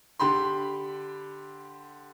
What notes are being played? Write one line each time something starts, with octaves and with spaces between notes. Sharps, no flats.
D3 G4 B5 C6